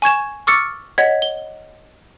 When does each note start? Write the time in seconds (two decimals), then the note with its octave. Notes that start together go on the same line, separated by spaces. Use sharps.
0.02 G#5 C#6 G#6 E7
0.47 C#6 D6 E6 F6 A6 C#7
0.98 C#5 D#5 F#5 G#6 B6
1.22 G7